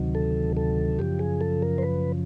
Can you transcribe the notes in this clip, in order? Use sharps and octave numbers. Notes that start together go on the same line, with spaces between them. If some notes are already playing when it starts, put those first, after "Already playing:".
Already playing: D2 C3 D#3 F#3
A4
A4
F#2 C#3 F3 G4
G#4
A4
A#4
C5
B4